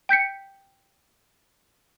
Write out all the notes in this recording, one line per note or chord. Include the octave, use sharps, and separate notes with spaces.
G5 G6 B6 C#7